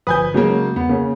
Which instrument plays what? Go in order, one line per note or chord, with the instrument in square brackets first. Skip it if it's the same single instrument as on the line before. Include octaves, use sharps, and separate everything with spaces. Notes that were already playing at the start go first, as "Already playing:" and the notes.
[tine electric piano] G1 F3 D#6 [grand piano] B4 G#5 G6
[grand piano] C#3 F#3 A#3 [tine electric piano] G#3 F#4 G#4
[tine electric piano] E2 [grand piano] B3
[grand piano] C#3 [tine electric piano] A#3